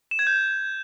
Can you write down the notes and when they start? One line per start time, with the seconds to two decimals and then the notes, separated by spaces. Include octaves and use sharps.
0.11 E7
0.19 G#6
0.27 G6